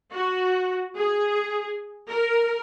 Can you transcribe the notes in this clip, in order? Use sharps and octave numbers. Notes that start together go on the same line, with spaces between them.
F#4
G#4
A#4